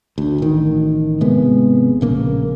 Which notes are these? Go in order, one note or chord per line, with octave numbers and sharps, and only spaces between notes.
D2
A1 D#3
G#1 C3 G#3 B3
A#1 C#3 A#3